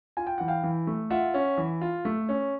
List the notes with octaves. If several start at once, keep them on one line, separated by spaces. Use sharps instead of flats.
F4 G#5
G5
E3 F#5
F5 G5
E3
A3
F4 E5 F#5
C#4
E3
F4
A3
C#4